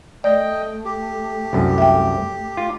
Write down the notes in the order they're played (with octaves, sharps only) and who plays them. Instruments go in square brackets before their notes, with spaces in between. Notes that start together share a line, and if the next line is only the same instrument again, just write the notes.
[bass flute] A3 [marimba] D5 [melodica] D#5 G5
[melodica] G4
[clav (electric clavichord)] C2 F#2
[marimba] E5 G5
[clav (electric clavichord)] F4